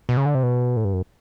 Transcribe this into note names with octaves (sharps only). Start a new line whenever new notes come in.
B2
C#3
D3
C3
B2
A2
G2
F#2